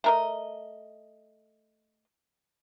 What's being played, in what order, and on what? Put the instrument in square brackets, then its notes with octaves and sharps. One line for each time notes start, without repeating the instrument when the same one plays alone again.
[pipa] A3 A#4 D#5